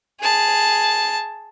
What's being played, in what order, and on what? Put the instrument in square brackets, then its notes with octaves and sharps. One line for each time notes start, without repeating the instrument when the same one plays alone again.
[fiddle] G#4 A5